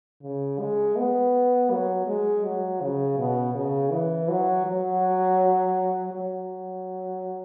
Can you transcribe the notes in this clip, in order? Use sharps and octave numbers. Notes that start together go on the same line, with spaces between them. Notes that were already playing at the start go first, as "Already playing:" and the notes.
C#3
G#3
B3
F#3
G#3
F#3
C#3
B2
C#3
E3
F#3
F#3
F#3